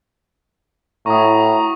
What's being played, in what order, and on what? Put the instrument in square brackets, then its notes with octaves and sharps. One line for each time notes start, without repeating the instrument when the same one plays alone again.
[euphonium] A2 [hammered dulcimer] E4 F#4 G#5 [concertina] A#5 [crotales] C#6 D#6